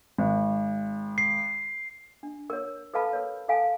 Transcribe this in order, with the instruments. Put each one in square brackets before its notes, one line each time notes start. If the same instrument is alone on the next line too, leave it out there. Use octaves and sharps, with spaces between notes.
[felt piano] G#1
[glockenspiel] C7
[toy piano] D4
A#4 C#5
A4 B4 F5 A5 B5
A#4 C#5
A4 F5 G#5 A5